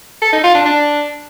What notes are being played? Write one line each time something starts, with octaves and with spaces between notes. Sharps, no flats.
A4
D#4
F4
D4
D4